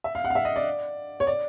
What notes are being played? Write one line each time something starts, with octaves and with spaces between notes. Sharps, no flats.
E5
F5
F#5
F5
E5
D#5
D5
C#5
D5